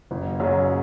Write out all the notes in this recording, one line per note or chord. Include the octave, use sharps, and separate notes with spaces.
F#1
F#2 C#3 F#3 C#4